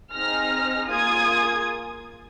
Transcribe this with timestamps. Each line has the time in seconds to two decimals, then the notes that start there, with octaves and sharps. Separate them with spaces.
0.14 C4 D#4 G#4 F6 A#6
0.90 A#3 F4 G#4 D#6 G#6